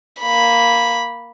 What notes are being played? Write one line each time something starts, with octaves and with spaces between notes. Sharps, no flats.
A#3 B5